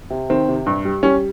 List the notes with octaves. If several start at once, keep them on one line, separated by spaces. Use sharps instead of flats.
C3
D#3 C4
C3
G2
G3
G3 C#4